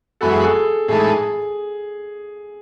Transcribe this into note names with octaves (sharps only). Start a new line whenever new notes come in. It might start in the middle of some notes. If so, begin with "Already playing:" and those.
F#2 E3 G#3 B3 F#4 A4
G#4
A4
A2 E3 G#3 D#4 G#4 A4